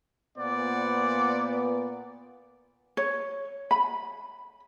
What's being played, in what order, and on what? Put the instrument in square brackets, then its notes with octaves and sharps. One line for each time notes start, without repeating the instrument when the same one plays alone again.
[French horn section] A#2 B3 [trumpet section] C5 D5 F#5
[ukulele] C#5
B5